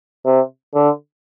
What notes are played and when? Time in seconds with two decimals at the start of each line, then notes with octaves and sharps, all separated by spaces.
0.25 C3
0.74 D3